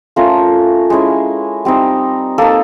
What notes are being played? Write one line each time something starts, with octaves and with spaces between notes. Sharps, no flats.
A3 C#4 F4 A#4
G#3 C#4 E4
G3 C4 D#4
A#3 D#4 A4